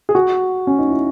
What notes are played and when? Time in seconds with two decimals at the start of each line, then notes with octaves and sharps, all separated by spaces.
0.09 G#4
0.15 F#4
0.67 C#4
0.79 D#4
0.90 E4